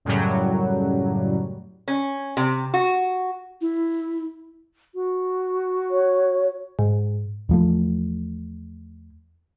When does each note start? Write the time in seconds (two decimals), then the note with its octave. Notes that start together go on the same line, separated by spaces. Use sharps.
0.05 F#2 A2 C#3 F#3 G3
1.88 C#4
2.37 C3
2.74 F#4
3.61 E4
4.95 F#4
5.91 C#5
6.79 G#2
7.49 E2 F3 A3